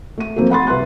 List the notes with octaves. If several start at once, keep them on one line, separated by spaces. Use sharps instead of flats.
A3 D#7
F3 F#3 A#3 C4 F#4 A4
F#5 B5 C6 A6
C2 B4 E5 C6 F#6